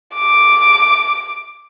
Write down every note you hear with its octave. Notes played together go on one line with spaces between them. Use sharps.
D6